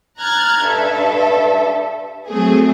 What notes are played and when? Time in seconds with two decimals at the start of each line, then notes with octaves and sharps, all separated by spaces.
0.18 A#5 F6 F#6 G#6 A6
0.63 G2 A4 E5
2.29 F#3 A3 C4 G#4